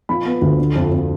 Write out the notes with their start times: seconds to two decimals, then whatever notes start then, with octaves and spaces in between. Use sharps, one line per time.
0.09 F3 B5
0.25 B3
0.42 D2
0.59 D3
0.76 F2
0.91 F2